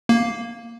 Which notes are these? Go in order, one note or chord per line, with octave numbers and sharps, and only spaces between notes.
A#3